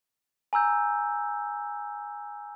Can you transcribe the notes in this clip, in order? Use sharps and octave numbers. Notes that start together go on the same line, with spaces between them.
G#5 A#5 E6 G6